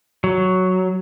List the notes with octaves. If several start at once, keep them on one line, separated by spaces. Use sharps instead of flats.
F#3